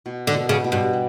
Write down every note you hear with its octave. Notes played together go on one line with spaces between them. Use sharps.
B2
D3
B2
C#3
B2
G2
G3